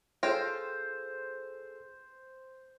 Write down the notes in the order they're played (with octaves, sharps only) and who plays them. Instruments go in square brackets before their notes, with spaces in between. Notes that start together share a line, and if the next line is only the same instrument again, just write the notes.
[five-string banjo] F4 [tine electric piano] G#4 A4 E6 [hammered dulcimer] C5 [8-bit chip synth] C#5 G5 A#6